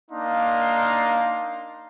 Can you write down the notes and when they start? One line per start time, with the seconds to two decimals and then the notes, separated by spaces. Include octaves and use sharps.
0.10 A#3 D4 D#4 F5 C6